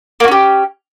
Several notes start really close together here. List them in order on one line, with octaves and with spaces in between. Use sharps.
A#3 F#4 C#4 G4